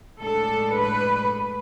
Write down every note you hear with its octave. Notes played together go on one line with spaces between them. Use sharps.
A2 G#3 D4 A4
B4